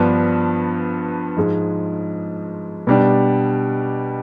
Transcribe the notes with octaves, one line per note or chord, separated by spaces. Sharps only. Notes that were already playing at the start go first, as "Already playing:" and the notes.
Already playing: G2 F3 B3 D4
G#2 F3 G#3
B2 G3 D4